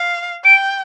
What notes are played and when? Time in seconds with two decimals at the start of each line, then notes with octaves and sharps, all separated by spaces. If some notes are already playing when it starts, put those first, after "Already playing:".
Already playing: F5
0.45 G5 D7